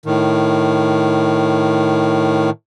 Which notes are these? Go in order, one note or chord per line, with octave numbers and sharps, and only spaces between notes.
A2 D#3